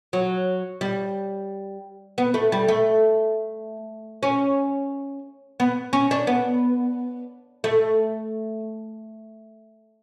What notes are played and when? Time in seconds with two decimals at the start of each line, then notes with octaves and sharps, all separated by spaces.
0.13 F#3
0.81 G3
2.18 B3
2.34 A3
2.52 G3
2.68 A3
4.23 C#4
5.60 B3
5.93 C#4
6.11 D4
6.27 B3
7.64 A3